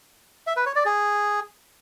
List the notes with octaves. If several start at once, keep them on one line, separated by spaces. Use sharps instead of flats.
E5
B4
C#5
D5
G#4